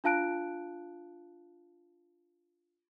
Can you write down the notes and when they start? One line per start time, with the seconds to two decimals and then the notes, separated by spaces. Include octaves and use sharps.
0.04 D4 F4 F5 A5 F#6 D7